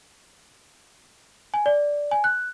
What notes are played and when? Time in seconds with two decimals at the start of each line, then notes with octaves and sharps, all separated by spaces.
1.54 G#5
1.66 D5
2.11 G#5
2.24 F#6